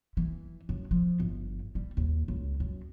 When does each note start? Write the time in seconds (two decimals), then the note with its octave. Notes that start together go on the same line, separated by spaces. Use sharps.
0.17 E3
0.69 F#2
0.91 F3
1.20 G1
1.75 G3
1.97 D#2
2.28 C#2
2.60 F#2